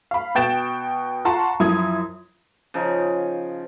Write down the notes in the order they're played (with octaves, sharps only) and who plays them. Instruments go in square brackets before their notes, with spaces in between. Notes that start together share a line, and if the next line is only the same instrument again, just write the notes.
[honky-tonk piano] F5 B5
B2 G5 A6 E7
F4 F#5 A5 A#5 C6 C#6
F#2 F3 E4 D#6 G#6
[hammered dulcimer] C#3 F3 D#4